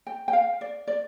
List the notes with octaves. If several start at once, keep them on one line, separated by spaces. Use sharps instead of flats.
G5
G5
F5
D5
D5